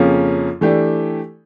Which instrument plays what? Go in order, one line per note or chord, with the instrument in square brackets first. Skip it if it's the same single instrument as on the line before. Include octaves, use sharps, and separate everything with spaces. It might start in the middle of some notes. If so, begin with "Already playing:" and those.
Already playing: [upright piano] F2 C#3 F3 A#3 C#4
E3 A3 D4 G4